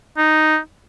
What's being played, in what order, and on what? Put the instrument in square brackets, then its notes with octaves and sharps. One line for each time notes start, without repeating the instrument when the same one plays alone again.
[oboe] D#4